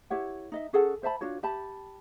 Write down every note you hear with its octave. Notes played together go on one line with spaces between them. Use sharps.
E4 G4 C#5 F#5
D#4 D#5 E5
C#4 G#4 A4 F#5
C5 E5 A5 B5
D4 F4 F#4 C#5
G4 E5 A5 B5